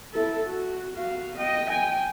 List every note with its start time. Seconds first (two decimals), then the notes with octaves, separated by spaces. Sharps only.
0.13 E4 A4
0.46 F#4
0.96 F#4 F5
1.38 D#5 G5
1.67 G5 G#5